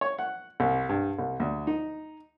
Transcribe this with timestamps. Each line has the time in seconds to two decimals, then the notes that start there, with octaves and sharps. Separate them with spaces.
0.01 C#5
0.19 F#5
0.60 C2
0.89 G2
1.19 C2
1.40 D2
1.67 D#4